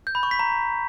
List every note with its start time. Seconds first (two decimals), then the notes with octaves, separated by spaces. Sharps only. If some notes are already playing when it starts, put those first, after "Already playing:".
0.07 G6
0.15 B5
0.23 C#6
0.31 B6
0.39 A#5